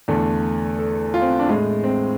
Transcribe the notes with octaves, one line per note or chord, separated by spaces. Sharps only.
E2 D3 A3
A4
F4
C4
D4
A2 G#3
C4